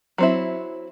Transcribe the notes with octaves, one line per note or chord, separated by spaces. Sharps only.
F#3 C4 E4